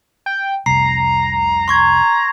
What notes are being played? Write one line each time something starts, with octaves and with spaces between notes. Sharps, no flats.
G5
F1 C2 A#5 C7
C6 C#6 G#6